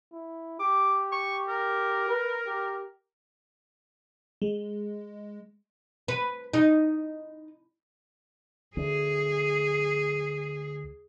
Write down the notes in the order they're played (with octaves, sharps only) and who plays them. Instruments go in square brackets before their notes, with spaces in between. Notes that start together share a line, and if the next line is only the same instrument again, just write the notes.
[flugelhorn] E4
[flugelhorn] G4 [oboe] D6
[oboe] C#6
A#4
[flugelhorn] B4
G4
[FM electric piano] G#3
[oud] B4
D#4
[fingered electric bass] D2 [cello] G#4